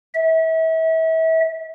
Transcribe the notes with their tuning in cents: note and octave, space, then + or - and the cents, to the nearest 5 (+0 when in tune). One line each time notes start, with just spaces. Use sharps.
E5 -35